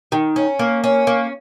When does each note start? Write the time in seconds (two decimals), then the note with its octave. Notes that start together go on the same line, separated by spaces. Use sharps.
0.12 D#3
0.36 C#4
0.59 A#3
0.84 C#4
1.07 A#3